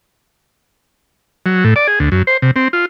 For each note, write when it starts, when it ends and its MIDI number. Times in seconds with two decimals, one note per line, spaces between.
1.46 1.64 54
1.64 1.74 45
1.76 1.87 74
1.87 1.99 68
2.00 2.09 38
2.12 2.23 42
2.27 2.37 72
2.42 2.51 48
2.56 2.68 60
2.73 2.86 65